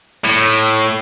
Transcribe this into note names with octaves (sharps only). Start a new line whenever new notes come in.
A2